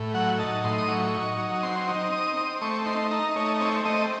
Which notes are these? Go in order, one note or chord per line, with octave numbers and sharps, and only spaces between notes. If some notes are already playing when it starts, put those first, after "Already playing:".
Already playing: A2
F#3 F#5
D#4 A5
A2 C6
D#6
F#3 C#6
D#4
F#3
C4 C6
D#4
C4 D#6
C4 D#6
A3 C#6
D#4 C6
D#4 A#5
A3 C#5
C4 C#5
A3 D#5